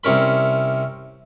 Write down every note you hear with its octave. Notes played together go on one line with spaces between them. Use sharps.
C2 C3 C#4 A#4 B5